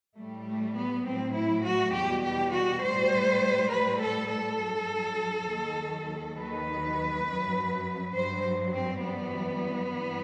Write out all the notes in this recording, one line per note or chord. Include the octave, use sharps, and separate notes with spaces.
A2 G3 A3
A3
B3
A2 F#3 C4
E4
F#4
E2 B2 G3 G4
G4
F#4
A2 G3 C5
A2 G3 B4
A4
A4
G2 F#3
D#2 D#3 F#3
D#2 D#3 F#3 B4
F#2 F#3
G2 F#3 C5
C4
F#2 E3 G3 B3
G2 E3 G3